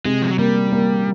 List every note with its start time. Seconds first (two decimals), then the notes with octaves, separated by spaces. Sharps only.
0.05 C3 G#3
0.22 F3
0.30 F#3
0.38 G3 A#3
0.72 A#3